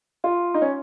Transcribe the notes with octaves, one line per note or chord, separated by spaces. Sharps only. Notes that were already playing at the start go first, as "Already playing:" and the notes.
F4
D#4
C#4